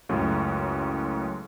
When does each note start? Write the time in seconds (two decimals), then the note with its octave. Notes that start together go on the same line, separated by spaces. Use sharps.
0.09 C#2 F#2 A2